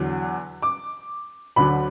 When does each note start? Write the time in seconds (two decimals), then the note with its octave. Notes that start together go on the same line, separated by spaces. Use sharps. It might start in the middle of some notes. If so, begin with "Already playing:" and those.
Already playing: E2 D3 F#3
0.62 D6
1.56 D2 D3 F#3 B5